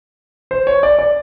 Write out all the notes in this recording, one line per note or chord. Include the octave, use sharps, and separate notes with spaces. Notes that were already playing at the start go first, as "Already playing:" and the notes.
C5
C#5
D5
D5